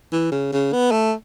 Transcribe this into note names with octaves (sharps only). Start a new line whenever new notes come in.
E3
C#3
C#3
B3
A3